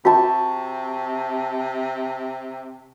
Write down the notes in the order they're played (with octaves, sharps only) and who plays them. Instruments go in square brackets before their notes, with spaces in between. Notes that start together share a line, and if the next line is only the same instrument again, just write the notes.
[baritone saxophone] C3 [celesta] F#4 [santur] A5 C#6